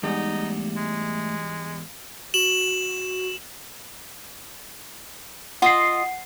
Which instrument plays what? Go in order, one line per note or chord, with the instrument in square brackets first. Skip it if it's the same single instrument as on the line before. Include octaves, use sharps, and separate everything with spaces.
[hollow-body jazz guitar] E2 G#2 G3 [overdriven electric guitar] A3 F#5 [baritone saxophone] D#4
[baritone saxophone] G#3
[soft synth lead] F#4 [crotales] E7 F#7
[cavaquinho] F4 D#5 [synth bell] F#5 C7